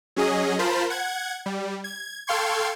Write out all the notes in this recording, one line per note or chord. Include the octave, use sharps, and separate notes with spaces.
F#3 C#4 G#4 D#5
F4 A#4 C5 A5 B5
F#5 G#6
G3
G#6
A4 F5 G5 C6 C#6 G#6